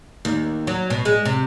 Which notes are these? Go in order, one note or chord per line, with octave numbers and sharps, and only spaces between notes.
D#2
F#3
B2
G#3
C3